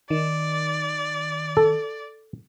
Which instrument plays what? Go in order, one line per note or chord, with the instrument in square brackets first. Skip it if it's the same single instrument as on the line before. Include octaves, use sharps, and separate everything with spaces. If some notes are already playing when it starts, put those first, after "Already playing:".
[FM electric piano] D#3 [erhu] D5
[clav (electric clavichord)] A4